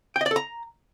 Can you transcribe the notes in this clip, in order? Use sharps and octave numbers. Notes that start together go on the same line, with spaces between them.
G5
D#5
D5
A4
A#5